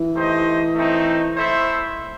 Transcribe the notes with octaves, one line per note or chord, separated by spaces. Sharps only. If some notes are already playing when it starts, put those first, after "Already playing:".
Already playing: E3
A3 D#4 G4 C5 D#5
A3 C4 D#4
A3 E4 A4 C5 E5